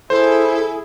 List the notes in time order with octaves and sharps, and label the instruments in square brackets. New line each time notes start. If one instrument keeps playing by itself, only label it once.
[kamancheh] E4 G#4 [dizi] A4 [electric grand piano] C5